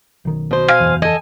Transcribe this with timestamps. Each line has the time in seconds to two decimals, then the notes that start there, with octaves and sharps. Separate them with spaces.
0.25 B1 D#3
0.51 B2 C5
0.68 F5 G#5
0.80 F#1 E2
1.02 A4 D#5 G#5